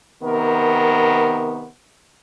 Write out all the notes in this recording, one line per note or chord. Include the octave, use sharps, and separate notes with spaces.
C3 D#3 B3 A#4